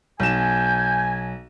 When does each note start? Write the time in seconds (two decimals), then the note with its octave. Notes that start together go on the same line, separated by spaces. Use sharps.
0.20 B1 G#5 G6 E7